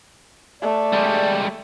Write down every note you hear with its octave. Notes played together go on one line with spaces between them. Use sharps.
A3 D5
G3 G#3